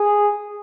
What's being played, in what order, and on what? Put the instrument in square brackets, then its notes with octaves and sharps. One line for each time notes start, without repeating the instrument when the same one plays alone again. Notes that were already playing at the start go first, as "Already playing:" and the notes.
Already playing: [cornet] G#4